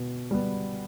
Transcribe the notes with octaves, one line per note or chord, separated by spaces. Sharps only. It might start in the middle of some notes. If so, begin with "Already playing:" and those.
Already playing: B2
G3 B3